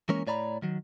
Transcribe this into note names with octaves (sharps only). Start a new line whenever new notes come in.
E3 G#3 A#3 C#4 A#4 C#5
A2 C#5 D5 A#5 B5
D#3 F#3